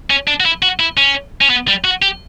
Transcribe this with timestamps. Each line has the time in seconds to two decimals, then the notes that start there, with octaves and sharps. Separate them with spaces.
0.10 C#4
0.28 D4
0.40 F#4
0.45 E4
0.62 F#4
0.80 E4
0.97 C#4
1.41 C#4
1.50 B3
1.68 G3
1.84 F#4
2.02 G4